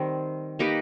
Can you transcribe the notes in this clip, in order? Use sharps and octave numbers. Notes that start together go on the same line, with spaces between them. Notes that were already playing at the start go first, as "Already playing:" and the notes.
Already playing: D#3 G3 C4
A#3 D#4 G4 B4